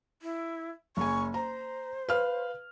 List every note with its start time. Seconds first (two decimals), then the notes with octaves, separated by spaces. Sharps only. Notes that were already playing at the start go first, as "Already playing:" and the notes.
0.22 E4
0.97 F#1 G#5 C#6
1.34 C5 A#5
2.09 B4 F5 F6